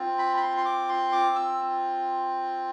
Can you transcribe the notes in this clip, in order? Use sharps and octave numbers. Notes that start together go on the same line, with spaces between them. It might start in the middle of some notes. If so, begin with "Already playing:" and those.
Already playing: C4 F4
B5
B5
C6
C6
D6
C6
D6
E6